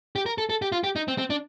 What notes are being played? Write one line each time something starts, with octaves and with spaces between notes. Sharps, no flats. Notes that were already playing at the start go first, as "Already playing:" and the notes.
G4
A#4
A4
A4
G4
F4
G4
D#4
C4
C4
D4